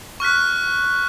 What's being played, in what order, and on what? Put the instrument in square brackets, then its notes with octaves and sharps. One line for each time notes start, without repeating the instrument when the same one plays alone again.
[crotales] C#6 F6 F#6 B6